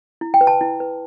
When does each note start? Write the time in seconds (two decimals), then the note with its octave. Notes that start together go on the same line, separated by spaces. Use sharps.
0.21 E4
0.34 G5
0.41 B4
0.47 A5
0.61 E4
0.80 B4